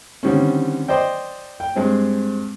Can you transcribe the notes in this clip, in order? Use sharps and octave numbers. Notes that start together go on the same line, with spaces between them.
D3 D#3 G3 C4 C#4
C5 D5 D#5 G5
G5
G2 G#3 C4